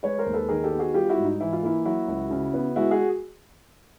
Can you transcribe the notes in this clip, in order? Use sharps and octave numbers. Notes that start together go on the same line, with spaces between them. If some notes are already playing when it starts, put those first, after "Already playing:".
G#3 B4 C#5
A#4 C5
D#2
A4 B4
D#3 G#4 A#4
G4 A4
B3
F#4 G#4
G3 F4 G4
E4 F#4
G#2
D#4
E3 E4
F4
A#3 E4
F#3 E4 F#4
C#2
C#3
B3
G#3 E4 F#4
F#4 G#4